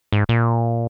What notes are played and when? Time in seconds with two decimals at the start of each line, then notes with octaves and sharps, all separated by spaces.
0.12 G#2
0.29 A#2